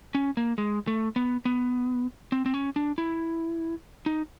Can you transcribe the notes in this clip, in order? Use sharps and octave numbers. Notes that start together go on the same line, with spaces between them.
C#4
A#3
G#3
A3
B3
B3
C4
C4
C#4
D4
E4
D#4